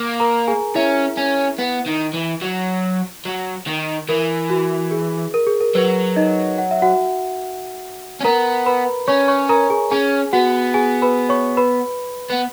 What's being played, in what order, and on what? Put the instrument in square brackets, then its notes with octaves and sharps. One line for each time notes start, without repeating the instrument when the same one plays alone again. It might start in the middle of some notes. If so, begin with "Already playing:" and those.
Already playing: [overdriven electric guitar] A#3
[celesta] A#4 A#5
G#4 G#5
[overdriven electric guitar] C#4 [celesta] E4 E5
[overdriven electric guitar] C#4
B3
D#3
E3
F#3
F#3
D#3
[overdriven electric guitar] E3 [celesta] A#4
[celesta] F#4
G#4
A#4
G#4
A#4
[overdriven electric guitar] F#3 [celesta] B4
[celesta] D#4 D#5
F#5
E5
F#4 F#5
[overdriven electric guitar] C#4
[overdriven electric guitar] B3 [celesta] A#4 A#5
[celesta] B4 B5
[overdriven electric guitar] C#4 [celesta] C#5 C#6
[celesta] C#5 C#6
A#4 A#5
G#4 G#5
[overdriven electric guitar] C#4 [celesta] G#4 G#5
[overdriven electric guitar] B3 [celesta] F#4 F#5
[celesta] G#4 G#5
B4 B5
C#5 C#6
B4 B5
[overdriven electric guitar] B3